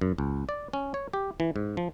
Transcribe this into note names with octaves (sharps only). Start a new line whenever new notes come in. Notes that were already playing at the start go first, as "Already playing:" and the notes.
F#2
C#2
D5
C#4
C#5
G4
E3
G#2
F3